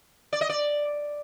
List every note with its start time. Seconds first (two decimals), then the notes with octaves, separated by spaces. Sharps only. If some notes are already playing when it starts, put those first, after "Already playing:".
0.33 D5
0.41 D#5
0.49 D5